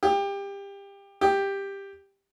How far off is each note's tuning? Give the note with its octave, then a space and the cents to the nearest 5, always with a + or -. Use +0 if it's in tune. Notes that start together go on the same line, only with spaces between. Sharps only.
G4 +25
G4 +10